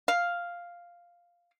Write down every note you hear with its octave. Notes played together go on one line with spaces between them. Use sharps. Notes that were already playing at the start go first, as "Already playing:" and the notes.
F5